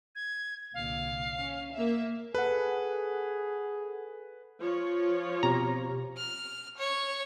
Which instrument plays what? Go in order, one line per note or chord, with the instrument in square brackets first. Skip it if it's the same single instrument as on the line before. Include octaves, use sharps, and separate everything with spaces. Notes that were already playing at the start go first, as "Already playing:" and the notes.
[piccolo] G#6
[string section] C2 A#2 D3 [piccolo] F5
[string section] C#4
A#3 E5
[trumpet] G#4 [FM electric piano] A4 F#5 [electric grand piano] B4
[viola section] F3 F4 C#5
[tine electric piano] B2 C4 G4 [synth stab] A#5
[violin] F6
C#5